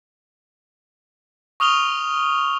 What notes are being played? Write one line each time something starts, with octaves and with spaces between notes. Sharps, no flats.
C#6 D#6 F6 F7 G7